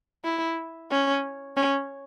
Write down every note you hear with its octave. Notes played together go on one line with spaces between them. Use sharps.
E4
C#4
C#4